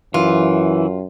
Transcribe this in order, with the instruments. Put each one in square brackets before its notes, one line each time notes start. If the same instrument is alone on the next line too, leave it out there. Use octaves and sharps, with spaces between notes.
[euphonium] F#2 [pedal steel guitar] E3 [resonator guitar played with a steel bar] F4